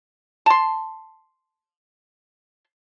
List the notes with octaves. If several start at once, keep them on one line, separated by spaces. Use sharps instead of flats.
A5 C6